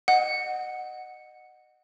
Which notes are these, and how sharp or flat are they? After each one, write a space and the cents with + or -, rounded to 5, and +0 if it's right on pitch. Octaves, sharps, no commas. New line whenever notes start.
D#5 -20 F#5 +0